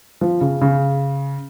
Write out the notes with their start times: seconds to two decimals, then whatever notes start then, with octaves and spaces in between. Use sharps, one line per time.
0.21 F3
0.41 C#3
0.61 C#3